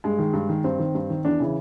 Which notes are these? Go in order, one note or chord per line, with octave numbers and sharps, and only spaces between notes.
G2 G#3
D#3
G2
D#3
G2 C4
D#3
G2
D#3
E2 D4
C#3 E3